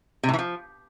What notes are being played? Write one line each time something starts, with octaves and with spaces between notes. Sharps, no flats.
C3
A2
E3
F3